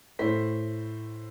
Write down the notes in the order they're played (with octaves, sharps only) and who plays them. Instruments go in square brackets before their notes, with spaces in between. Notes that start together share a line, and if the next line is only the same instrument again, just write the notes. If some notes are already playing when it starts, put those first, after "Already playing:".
[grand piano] A2 A3 C5 B6